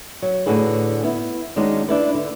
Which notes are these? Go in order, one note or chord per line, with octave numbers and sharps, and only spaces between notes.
F#3
A2 D3 F#4 G#4 B4
B3 E4
D#3 G#3 C#4 D4 F#4
D4 E4 B4
D3